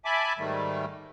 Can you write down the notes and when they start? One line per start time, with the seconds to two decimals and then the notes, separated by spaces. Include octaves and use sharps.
0.05 E5 G#5 A5 B5 D6
0.38 G#2 D#3 G3 A3